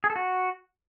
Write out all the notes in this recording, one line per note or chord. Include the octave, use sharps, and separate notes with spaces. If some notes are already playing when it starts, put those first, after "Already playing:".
G#4
A4
F#4